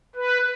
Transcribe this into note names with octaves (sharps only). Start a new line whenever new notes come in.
B4